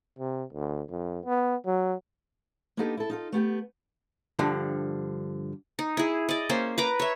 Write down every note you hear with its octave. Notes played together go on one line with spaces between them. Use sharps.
C3
D2
F2
B3
F#3
A#3 B3 D4 D#4 G4 A4
E4 A4
D#4 F4 A4
A3 B3 G4
G2 D3 F3
D#4
E4 G#4
D5 D#5
A#3 C#4 C5
B4 A#5 D6
C#5 E5